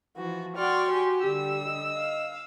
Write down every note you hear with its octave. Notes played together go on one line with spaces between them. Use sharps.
E3 F3 F#4
F#4 D5 G5 C6 C#6 F6
G4 G#5
D3 G3 G4 E6
D#5
F5